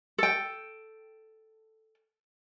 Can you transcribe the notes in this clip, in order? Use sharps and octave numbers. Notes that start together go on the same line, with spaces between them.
A4 G5